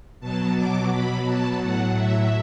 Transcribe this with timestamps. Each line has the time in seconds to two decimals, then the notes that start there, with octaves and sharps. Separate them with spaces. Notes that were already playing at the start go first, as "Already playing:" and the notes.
0.20 B2 F#3 A5
0.55 D6
0.91 B2 F#3 B5
1.25 A5
1.60 A2 F#3 F#5
1.95 E5